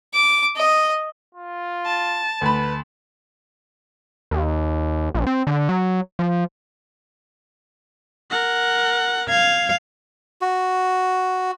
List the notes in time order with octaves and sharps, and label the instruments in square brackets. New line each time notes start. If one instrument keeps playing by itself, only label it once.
[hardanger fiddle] D6
D#5
[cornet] F4
[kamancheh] A5
[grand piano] D2 B5 [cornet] B4
[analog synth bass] D#2
A#1
C4
D3
F#3
F3
[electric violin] A#4 F#5
[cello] F5 [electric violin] G#6
[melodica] F#4